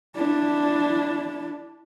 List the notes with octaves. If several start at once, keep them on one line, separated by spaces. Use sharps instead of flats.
D4 E4